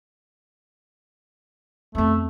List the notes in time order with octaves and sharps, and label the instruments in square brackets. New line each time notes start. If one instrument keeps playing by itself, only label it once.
[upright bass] F2 B3 [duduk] A3